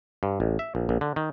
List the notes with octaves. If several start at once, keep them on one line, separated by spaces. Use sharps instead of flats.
G2
A1
E5
A#1
A#1
D3
D#3